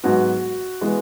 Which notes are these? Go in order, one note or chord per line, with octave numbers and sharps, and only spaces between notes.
G#2 F#3 B3 F#4
E3 G#3 B3